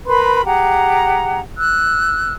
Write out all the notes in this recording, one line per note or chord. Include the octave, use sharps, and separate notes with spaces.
A#4 B4 B5 C6
G4 G#4 F#5 A#5
E6 F#6